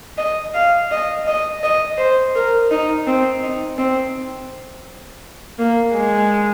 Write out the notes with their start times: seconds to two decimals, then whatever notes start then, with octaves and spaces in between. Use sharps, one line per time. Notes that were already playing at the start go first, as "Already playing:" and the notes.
0.18 D#5
0.54 F5
0.91 D#5
1.27 D#5
1.63 D#5
1.98 C5
2.35 A#4
2.71 D#4
3.07 C4
3.43 D#4
3.78 C4
5.59 A#3
5.95 G#3